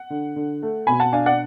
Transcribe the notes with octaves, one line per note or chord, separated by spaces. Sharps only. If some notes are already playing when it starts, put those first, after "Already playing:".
Already playing: F#5
D3
D3
A3
B2 G#5 B5
F#5 A5
D4 F5 G#5
D5 F#5